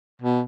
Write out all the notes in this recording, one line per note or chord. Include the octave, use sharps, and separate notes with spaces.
B2